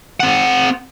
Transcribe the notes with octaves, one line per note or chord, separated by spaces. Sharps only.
C4 F#5